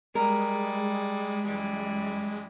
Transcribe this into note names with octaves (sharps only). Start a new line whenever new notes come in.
G3 G#3 G#4 A#4
F#2 E3 G3